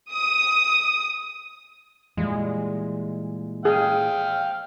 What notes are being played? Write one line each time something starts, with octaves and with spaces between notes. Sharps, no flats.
D#6
A#2 E3 G3 G#3
G#4 F5 G5